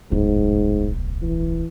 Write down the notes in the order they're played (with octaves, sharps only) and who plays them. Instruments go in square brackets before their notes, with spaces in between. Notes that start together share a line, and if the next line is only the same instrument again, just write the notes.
[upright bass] D1 B1 [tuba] G#2
[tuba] E3